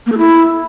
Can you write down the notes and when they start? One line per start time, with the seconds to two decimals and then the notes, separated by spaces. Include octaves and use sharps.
0.07 A#3
0.12 A4
0.18 E4